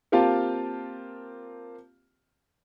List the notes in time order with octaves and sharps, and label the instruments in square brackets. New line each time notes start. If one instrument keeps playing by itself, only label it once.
[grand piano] A#3 C4 F4 G4 F5 A5